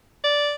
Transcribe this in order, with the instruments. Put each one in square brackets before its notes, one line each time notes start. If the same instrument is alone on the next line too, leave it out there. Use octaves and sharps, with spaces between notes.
[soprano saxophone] D5